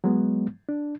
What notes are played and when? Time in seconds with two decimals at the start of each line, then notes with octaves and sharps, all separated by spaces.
0.04 F#3 G#3 B3
0.69 D4